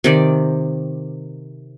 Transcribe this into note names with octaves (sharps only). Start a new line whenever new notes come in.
C3 D#3 D5